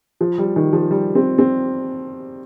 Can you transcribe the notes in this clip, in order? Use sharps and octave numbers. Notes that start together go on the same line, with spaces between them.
F3
G3
D#3
F3
G3
C4
C4